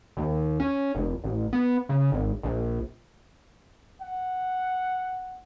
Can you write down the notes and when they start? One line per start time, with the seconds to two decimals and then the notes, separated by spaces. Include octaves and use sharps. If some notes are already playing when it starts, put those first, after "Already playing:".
0.17 D#2
0.60 C#4
0.95 F1
1.24 A1
1.53 B3
1.89 C#3
2.12 G#1
2.43 A#1
4.01 F#5